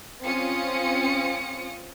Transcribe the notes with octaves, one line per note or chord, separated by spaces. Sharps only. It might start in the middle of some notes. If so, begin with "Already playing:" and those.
C4 C#4 F4 D#6 C#7